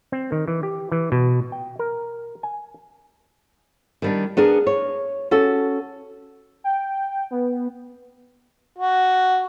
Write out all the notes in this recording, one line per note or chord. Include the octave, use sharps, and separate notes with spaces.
C4
D#3
E3
G4
E3
B2
G5
A#4
G#5
D#3 G3 D4
B3 D4 G#4 A#4
C#5
C#4 F#4 A4
G5
B3
F#4